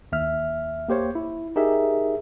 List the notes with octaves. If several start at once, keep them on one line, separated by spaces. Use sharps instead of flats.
D#2 E5 F6
A#3 G4 C5 C#5
E4
D#4 G4 G#4 A#4 E5